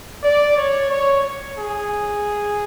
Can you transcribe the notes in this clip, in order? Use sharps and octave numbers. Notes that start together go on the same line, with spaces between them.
D5
C#5
C#5
G#4